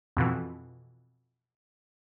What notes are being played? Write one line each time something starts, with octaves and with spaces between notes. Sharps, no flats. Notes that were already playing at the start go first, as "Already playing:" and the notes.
F2 B2 E3